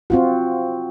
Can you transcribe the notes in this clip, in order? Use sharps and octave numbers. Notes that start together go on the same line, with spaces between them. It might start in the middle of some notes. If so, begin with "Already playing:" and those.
C4 F4 F#4